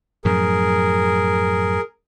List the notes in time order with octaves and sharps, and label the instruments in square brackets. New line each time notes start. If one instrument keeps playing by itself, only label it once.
[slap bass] F#2 A2 F3 [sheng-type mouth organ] G#4 A#4